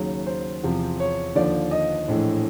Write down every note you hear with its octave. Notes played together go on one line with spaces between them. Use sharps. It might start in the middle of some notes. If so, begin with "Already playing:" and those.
Already playing: D#2 C#3 F#3
C5
E2 C3 F3
C#5
D#2 D3 F3 D5
D#5
A#1 A2 E3